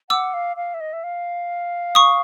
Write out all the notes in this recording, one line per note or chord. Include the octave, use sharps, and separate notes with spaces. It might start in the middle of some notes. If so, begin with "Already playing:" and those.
F#5 D6 E6
F5
F5
E5
D#5
E5
F5
C#6 D#6